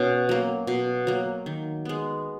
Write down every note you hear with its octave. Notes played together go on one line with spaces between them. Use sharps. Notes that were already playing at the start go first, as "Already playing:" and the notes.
Already playing: B2 C#4
F#3 A#3
B2
F#3 A#3
D#3
G#3 B3